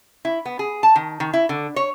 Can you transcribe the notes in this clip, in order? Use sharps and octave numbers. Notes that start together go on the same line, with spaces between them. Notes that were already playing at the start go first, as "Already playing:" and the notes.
E4
B3
G#4
A5
D#3
D#3
E4
D3
C#5